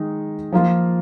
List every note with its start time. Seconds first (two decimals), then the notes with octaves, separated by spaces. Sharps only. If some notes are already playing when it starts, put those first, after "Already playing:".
Already playing: D#3 G#3 D#4
0.52 F3 A#3 F4